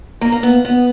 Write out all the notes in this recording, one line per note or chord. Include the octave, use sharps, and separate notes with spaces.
A#3
A#3
B3
B3